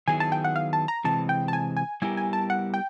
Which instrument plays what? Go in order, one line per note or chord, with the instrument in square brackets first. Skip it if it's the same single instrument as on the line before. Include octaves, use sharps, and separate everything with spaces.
[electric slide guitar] D#3 F#3 B3 E4 G#4 [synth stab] G#5
[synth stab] A5
G5
F#5
F5
A5
A#5
[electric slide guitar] C3 E3 G#3 C4 [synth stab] A5
[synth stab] G5
A5
G#5
G#5
[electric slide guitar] G3 B3 E4 G4 A#4 [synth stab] G#5
[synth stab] G#5
A5
F#5
G5